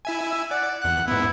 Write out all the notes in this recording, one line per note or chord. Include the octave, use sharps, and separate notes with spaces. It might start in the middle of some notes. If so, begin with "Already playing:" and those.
E4 E5 G#5
E6
D5 F#5
E2 F#5 F#6
G#2 B3 E4